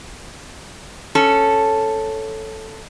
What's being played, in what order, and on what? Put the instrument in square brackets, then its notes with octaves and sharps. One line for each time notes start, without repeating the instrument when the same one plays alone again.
[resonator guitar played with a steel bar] C#4 A4